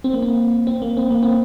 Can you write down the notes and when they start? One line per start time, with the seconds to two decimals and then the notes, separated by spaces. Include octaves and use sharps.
0.04 C4
0.14 A#3
0.23 C4
0.67 C4
0.82 A#3
0.97 C4
1.11 A#3
1.23 C4